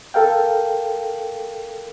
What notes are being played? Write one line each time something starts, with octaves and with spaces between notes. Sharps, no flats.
A4 A#4 F5 G5